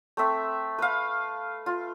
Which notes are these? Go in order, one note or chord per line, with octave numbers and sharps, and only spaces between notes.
A3 C4 E5
B4 F5
F4